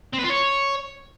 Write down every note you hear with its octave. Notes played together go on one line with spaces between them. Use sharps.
C4
B4
F4
C#5